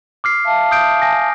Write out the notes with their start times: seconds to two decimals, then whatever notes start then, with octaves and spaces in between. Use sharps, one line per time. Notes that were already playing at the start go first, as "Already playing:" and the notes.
0.24 D6 F6 C7
0.45 E5 F5 A5
0.71 D#6 G6 D7
1.02 G#5 A#6